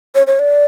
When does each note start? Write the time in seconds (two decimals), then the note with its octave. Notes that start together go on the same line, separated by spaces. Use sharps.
0.15 C#5
0.27 C#5
0.39 D5